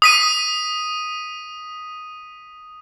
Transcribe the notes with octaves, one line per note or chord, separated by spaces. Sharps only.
D#6 B6 D#7